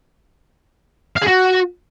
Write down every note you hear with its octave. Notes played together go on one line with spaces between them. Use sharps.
F5
G#4
F#4